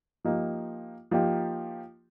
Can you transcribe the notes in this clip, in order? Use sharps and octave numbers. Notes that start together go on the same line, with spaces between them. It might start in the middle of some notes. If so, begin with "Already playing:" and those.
F3 A#3 D#4 G4
F3 A#3 D#4 G4